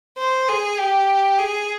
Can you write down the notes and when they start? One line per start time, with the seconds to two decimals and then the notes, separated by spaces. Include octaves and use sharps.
0.18 C5
0.48 G#4
0.78 G4
1.38 G#4